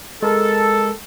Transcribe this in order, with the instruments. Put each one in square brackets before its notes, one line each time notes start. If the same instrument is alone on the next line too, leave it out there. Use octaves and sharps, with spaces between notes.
[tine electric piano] G#3 A#4 [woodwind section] A4